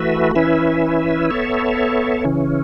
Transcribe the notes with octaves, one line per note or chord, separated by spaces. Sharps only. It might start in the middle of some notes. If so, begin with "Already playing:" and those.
Already playing: E3 A3 F#4 B4 E5
E3 C#4 E4 B4 E5
B3 A4 C#5 E5
C#3 E3 C#4